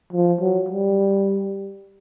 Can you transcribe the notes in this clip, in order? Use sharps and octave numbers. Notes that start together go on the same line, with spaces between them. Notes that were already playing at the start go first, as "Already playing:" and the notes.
F3
F#3
G3